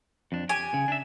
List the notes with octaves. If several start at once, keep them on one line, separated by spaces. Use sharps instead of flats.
F2 D4
G4 G#5
C#3
D4 E5